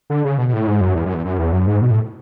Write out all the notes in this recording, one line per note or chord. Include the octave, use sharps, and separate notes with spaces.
D3
C#3
B2
B2
A2
G#2
F#2
E2
F#2
E2
F#2
E2
F#2
G#2
B2
A2